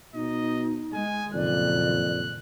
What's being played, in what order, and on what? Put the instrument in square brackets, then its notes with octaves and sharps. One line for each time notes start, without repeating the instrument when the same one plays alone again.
[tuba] B2 [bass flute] D#4 [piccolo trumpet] D#5
[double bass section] G#3 [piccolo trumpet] G#5
[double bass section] F#1 A#2 D#3 [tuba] F2 [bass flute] D5 [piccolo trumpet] F#6